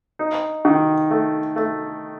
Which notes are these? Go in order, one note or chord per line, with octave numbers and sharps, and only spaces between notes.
D#4
D#3
A3
A3